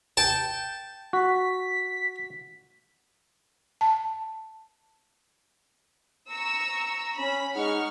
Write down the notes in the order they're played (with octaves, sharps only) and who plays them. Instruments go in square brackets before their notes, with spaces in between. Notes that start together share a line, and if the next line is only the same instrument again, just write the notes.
[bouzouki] G5 [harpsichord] A5
[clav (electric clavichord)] F#4 [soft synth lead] B6
[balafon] A5
[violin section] A#5 C#6 E6
[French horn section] C#4 [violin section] B5
[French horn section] G#3 D#4 [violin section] F#5 C#6 F6